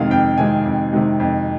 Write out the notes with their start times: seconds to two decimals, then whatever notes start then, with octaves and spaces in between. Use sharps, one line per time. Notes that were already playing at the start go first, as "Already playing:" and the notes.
Already playing: F2 C3 D#3 G#3 F5
0.11 F2 G5
0.38 C3 D#3 G#3 G#5
0.65 F2
0.93 C3 D#3 G#3
1.20 F2